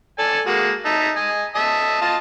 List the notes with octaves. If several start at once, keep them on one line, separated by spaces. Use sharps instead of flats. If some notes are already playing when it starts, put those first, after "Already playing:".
A4 D5 G#5
G#3 A#3 F#4
D#4 E5 A5
D#5 G#5
D#5 E5 A5
F4 D#5 A5